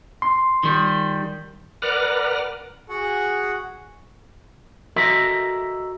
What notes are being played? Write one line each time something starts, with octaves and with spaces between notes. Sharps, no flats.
C6
D#3 G3
A#4 B4 D5 F#5 F6
F#4 G#4 F#5
F#4 A4 A#4 D#5 E5